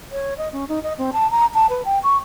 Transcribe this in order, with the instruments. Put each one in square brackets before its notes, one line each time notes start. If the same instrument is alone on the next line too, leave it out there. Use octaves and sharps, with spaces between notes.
[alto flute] C#5
D#5
C#4
D#4
D#5
C4
A5
A#5
A5
B4
G5
C#6